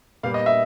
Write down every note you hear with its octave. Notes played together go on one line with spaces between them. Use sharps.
A#2 G3 B3 F5
D#5
E5